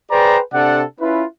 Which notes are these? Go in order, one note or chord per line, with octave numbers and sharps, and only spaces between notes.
G#4 B4 C5 D5 G5 A#5
C3 D4 A4 D5 F#5
C#4 E4 F4 B4